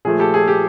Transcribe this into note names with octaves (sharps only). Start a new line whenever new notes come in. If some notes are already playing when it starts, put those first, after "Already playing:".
A#2 F3 A3 G#4
G4 A4
G#4
G4